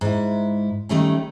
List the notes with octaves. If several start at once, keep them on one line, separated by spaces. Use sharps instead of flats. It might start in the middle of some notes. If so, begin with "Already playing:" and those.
G#2 E4
D#3 G3 A3 C#4